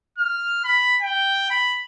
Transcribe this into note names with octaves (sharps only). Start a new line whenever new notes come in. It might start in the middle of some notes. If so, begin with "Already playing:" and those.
F6
B5
G5
B5